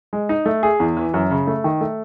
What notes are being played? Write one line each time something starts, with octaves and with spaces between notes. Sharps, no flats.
G#3
D#4
A3
G#4
E2
E3
F#2
C#3
A3
D#3
A3